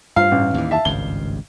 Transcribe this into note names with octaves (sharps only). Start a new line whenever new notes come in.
G2 F4 F5
A1
D#2 E3
E5 A5
G#1 C#2 G2 G7